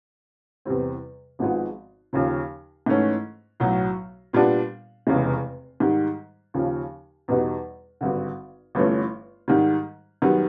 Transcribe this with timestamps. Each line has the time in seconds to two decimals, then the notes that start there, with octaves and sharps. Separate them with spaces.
0.65 E2 C3 E3 G3 C4
1.39 G#1 G#2 F3 G#3 B3
2.13 D#2 C#3 F3
2.86 G#2 E3 A3 C#4
3.60 B1 A2 F#3
4.33 A#2 G3 B3 D4
5.07 F1 E2 C#3 E3 G#3
5.80 G#2 D#3 G3
6.54 D#2 C#3 F3
7.28 E2 B2 G3 B3 D#4
8.01 G#1 G2 D3
8.75 G1 G2 E3 A3 C#4
9.48 G#2 D#3 G3
10.22 F#2 D#3 G3 B3